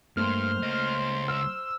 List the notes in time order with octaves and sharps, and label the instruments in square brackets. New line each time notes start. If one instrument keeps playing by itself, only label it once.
[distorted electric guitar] G2 [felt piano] A3 A#3 [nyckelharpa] C5 C6 [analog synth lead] F6
[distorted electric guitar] C#2 D#5
[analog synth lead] E6 [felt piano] F6